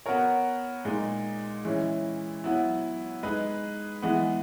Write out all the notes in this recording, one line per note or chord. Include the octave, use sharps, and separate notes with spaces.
B3 F#4 A#4 C#5
A#2 G#3 D#4
E3 G#3 C#4 E4
F#3 B3 E4
G#3 D#4 G#4 B4
E3 G#3 B3